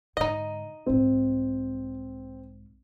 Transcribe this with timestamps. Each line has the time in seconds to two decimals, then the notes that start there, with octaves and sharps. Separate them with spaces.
0.17 G#2 D3 D#4 D#5
0.86 B1 G#2 C4